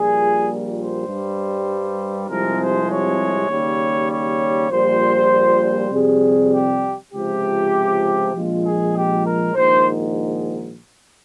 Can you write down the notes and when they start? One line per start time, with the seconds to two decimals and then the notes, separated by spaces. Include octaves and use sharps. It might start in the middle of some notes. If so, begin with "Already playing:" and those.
Already playing: A#1 A#2 G3 G#4
0.77 C5
1.08 G2 G3
2.28 C2 C3 F3 G#3 A#4
2.59 C5
2.89 C#5
3.49 D#2 C#3 G3
4.10 C#5
4.70 A#1 A#2 G3 C5
5.92 F2 C3 G3 G#4
6.52 G4
7.13 C#2 C3 F3 G4
8.33 A#1 A#2 F3 G#3 F4
8.64 G#4
8.95 G4
9.25 A#4
9.55 A#1 G#2 D#3 C5